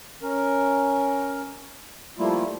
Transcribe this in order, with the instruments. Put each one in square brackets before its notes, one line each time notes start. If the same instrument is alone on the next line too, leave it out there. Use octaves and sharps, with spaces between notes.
[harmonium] C#4 A#4
F3 G3 A3 A#3 E4 F4